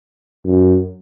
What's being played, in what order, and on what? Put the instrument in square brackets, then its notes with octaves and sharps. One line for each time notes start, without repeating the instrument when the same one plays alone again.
[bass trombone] F#2